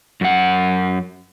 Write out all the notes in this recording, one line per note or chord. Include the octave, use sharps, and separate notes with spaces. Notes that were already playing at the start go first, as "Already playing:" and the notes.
F#2 F#5